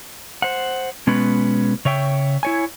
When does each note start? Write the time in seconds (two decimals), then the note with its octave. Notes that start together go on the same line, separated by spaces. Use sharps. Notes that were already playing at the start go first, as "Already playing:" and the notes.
0.42 C5 F#5
1.07 B2 G#3 B3 C#4 B4
1.85 C#3 C#5 E5 G5
2.43 E4 C#5 G#5